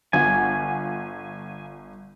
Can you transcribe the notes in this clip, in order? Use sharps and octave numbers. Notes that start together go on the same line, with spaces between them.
G1 F4 F#5 G#5